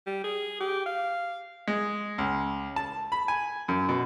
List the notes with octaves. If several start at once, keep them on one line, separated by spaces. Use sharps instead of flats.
G3
G#4
G4
F5
G#3
C#2
A5
B5
G#5
F#2
B2